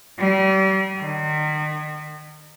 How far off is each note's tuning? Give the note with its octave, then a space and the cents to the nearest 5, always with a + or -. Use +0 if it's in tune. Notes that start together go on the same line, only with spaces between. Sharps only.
G3 -35
D#3 -35